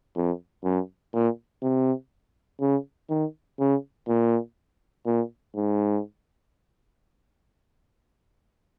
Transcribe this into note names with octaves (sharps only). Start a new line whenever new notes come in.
F2
F#2
A#2
C3
C#3
D#3
C#3
A#2
A#2
G#2